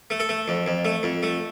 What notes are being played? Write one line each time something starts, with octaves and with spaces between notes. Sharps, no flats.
A3
A4
A3
F2
F2
A3
F2
A3